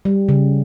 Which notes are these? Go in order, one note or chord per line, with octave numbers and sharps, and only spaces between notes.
G3
C#3